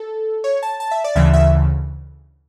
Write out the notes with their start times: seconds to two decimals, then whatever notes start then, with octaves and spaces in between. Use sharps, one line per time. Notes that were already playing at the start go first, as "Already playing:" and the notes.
Already playing: A4
0.44 C#5
0.63 A5
0.80 A5
0.91 E5
1.04 D5
1.16 D2 C#3 E3 E5
1.34 E5